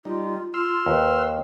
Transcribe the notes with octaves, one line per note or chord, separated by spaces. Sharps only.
G3 D#4 F4
F4 C6 E6 F6
D#2 B4